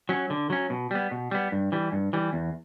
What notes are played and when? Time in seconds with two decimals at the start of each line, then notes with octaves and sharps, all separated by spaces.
0.09 F#3 C#4
0.30 D3
0.50 F#3 C#4
0.70 B2
0.91 G3 B3
1.11 B2
1.31 G3 B3
1.52 G2
1.72 E3 G3
1.92 G2
2.13 E3 G3
2.33 E2